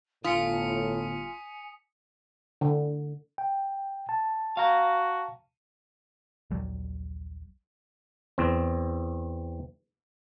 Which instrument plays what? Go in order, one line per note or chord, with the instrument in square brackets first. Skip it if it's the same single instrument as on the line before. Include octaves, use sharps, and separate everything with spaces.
[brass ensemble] G1 A2 [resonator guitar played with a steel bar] F4 [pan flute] G#5 [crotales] D#6 B6 C#7
[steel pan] D3
[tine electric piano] G5
A5
[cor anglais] F#4 [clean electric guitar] F5 A#5
[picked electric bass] D#1 A#1 F#3 G3
[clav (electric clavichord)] E2 C4